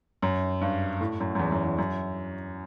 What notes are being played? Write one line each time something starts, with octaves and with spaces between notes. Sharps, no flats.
F#2
G2
A2
F#2
F#2
E2
F#2
E2
F#2